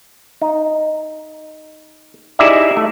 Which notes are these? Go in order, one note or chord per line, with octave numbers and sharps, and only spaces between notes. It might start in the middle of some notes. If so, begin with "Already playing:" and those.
D#4
D#4 E4 G4 G#4 D5 E5
A3